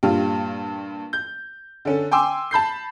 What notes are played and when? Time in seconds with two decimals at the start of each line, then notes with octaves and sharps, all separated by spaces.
0.03 G2 A#2 G3 F4
1.13 G6
1.85 D3 C#4 A4
2.11 G5 G#5 C6 D6 E6
2.51 A5 B5 G6 C7